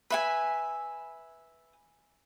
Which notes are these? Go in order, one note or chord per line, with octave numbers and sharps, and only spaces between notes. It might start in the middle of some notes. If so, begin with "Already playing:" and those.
B4 E5 G#5